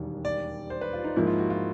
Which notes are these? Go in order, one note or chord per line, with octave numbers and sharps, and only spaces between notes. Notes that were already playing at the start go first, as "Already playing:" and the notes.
Already playing: E1 D#2 D#3 G3
D5
C5
B4
F4
D#4
G#2 F3 A#3 E4
F4
F#4
F4